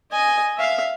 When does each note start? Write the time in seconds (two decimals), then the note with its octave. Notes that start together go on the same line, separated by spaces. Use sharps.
0.12 D#5 G#5
0.57 E5 F5